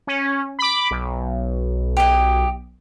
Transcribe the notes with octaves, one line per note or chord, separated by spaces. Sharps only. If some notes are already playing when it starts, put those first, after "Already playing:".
C#4
B5 D6
B1
G4 D#5